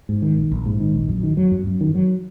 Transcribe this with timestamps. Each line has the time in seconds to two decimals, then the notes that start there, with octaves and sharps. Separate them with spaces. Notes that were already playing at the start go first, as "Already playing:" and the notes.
0.09 G#2
0.22 D#3
0.37 A#1
0.51 A#1
0.66 G#2
0.80 D#3
0.94 A#1
1.09 F#2
1.23 D#3
1.37 F#3
1.52 F#2
1.67 F#2
1.81 D#3
1.95 F#3